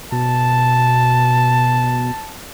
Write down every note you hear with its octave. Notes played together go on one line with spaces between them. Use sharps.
B2 A5